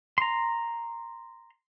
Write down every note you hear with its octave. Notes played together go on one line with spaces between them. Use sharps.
A#5 C6